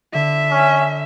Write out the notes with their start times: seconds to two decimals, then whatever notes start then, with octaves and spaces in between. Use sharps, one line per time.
0.14 D3 E5
0.51 C#4